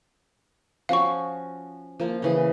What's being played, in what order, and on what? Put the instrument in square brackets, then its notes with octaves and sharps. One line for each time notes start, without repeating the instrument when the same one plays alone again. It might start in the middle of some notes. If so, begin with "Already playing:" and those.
[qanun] F3 C#4 F#4 [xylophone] F5 C#6
[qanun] F3 A#3 F4
C#3 E3 G#4